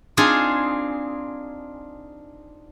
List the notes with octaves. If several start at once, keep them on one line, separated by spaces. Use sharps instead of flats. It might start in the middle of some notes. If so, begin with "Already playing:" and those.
C4 D4 D#4 F4 G#4